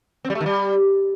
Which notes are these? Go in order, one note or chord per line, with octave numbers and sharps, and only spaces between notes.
C4
G3
A3
D#3
G3